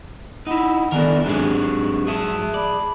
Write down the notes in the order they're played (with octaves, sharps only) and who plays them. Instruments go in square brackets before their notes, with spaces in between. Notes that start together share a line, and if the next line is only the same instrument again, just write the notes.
[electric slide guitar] D#4 E4 [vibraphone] F#5 B5
[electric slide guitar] D#3 B3 D4 [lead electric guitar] E4 A#4 [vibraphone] A4 D5 G#5
[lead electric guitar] G#2 F#3 [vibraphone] C4 [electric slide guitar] D4 G4 G#4
[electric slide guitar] G#4 E5 [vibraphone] A5
[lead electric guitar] D5 [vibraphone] A5 B5